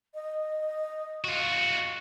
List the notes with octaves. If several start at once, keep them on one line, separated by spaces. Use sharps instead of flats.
D#5
F4 F#4